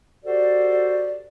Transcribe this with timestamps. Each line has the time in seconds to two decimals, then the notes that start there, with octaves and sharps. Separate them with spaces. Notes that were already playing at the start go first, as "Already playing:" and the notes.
0.25 F#4 G4 A4 C5 D5